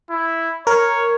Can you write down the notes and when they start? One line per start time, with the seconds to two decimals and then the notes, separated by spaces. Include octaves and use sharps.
0.10 E4
0.67 A#4 C#5